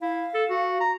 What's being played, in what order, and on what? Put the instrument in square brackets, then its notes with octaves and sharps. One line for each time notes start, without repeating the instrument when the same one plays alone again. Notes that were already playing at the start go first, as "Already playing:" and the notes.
[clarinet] E4 [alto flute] F5
[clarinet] A4
F#4
A#5